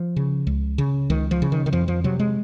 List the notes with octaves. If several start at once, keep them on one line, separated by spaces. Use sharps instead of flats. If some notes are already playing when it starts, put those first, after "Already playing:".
Already playing: F3
C#3
C#2
C#3
C#2 D#3
F3
C#3
D#3
D#3
F2 F3
F3
C3 F#3
G#3